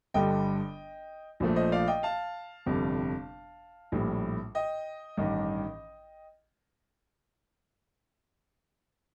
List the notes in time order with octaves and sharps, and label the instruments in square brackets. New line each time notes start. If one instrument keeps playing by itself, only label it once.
[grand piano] G1 G2 D3 G3 D#5 G5
A#1 A#2 F3 A3
C5 D#5
D5 F5
D#5 G5
F5 A5
G1 F2 C3 G3
A#1 A2 G3
D#5 G5
A1 G2 D#3